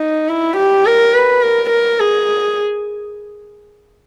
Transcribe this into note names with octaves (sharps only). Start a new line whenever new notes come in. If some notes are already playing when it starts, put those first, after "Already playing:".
Already playing: D#4
E4
G4
A#4
B4
A#4
A#4
G#4